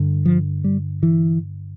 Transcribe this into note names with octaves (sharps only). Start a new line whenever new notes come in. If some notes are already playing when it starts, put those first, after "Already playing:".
Already playing: G2 D3
F3
G3
E3